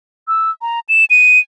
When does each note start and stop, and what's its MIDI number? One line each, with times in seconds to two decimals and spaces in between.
0.28 0.50 88
0.62 0.80 82
0.89 1.05 100
1.10 1.39 99